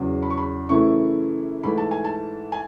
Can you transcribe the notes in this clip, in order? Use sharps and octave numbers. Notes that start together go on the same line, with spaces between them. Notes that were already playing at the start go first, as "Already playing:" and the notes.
Already playing: E2 C#3 F#3
B5
C#6
B5
F#2 C#3 E3 A3 E4 C#6
G#2 E3 A3 E4 B5
A5
G#5
A5
G#5